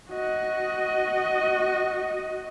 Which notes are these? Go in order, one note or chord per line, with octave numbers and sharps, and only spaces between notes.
F#4 D#5